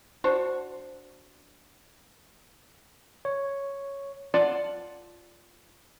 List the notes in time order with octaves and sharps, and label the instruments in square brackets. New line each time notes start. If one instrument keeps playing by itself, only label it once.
[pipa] D4 F#4 C5 C#6
[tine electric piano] C#5
[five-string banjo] F4 D5 F#5 A5